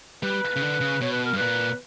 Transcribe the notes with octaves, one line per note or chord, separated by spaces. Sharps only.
G3 B4
C#3
D3
C#3
B2 C#5
B4
A#4
G2
A#2 B4